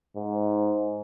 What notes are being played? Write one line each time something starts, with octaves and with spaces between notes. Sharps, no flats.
G#2